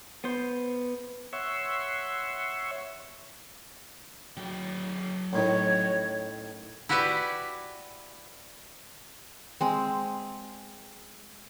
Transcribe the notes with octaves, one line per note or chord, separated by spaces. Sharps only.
B3 C5
C#5 E5 F#5 C6 C#6 E6
F#3 G5
A1 A2 D#3 C#5
E4 F#4 G4 B4 D5 E5
G#3 C4